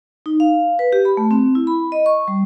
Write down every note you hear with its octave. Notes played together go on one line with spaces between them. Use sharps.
D#4
F5
B4
G4
B5
A3
C4
E4
B5
D#5
C#6
G3